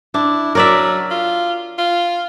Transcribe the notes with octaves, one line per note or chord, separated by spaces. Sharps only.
D4 E4
F#3 A#4 D5 E5
F4
F4